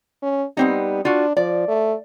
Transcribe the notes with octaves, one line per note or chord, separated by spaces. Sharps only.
C#4
G3 B3 C4 D#4
D4 F4 F#4
F3 D5
A3